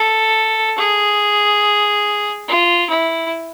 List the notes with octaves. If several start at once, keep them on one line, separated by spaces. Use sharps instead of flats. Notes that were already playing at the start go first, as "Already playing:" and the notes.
Already playing: A4
G#4
F4
E4